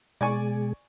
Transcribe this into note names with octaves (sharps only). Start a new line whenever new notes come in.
B2 G#3 G#4 D5 G#5 C#6